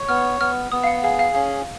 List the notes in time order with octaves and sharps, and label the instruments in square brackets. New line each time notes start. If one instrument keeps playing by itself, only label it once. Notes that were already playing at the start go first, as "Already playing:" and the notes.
Already playing: [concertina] C#5
[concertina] B3 [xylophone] F6
[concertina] B3 [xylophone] F6
[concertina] B3 [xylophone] D#6
[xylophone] F5
F#5
[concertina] G#4 [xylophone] F5
[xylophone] F5
[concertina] C#4 [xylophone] F5